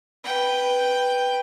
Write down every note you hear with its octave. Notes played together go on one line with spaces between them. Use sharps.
B4 G5